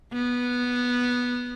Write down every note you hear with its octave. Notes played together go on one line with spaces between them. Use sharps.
B3